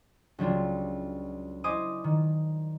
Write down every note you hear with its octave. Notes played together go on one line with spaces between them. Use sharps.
C#2 F#3 G3 D4 F4
E4 C5 D#5 G#5 D6 D#6
D#3